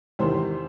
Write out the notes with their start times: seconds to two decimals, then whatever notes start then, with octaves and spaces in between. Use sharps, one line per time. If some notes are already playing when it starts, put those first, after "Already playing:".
0.19 E2 C3 D#3 C4 C5